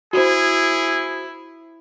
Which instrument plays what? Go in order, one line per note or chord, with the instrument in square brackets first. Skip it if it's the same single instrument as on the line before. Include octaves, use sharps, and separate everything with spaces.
[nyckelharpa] E4 [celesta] F#4 C5 [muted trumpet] G#4